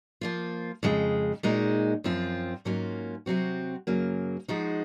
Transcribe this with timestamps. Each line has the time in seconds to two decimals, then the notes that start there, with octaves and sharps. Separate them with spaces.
0.21 F3 A#3 F4
0.83 F2 C#3 G#3
1.43 A#2 G#3 D#4 F#4
2.04 F#2 F3 C4 F4
2.65 G#2 F#3 A#3 C#4 F4
3.26 C3 F#3 C4 F#4
3.87 F#2 C#3 F#3 A#3
4.48 F3 G#3 D#4 F#4